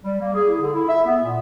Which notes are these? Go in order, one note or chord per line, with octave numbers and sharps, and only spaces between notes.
G3
A#3
G#4
E4
D3
E4
E5
B3
A#2